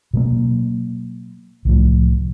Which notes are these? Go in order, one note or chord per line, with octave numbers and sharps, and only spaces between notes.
B2 F#3 A#3
C2 A2 F3